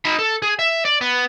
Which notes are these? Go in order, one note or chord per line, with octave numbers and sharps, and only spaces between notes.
D#4 B5
A4
G#4
E5
D5
B3